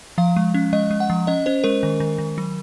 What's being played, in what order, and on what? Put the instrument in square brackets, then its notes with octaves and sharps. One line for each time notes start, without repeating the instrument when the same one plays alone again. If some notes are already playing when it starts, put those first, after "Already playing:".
[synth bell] F3 F5
G#3
C#4
G#3 D#5
G#3
F#5
F3
C#4 D#5
C#4 C5
G#3 A#4
D#3
D#3
D#3
F#3